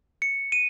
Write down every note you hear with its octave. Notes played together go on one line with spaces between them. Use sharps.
C#7
D#7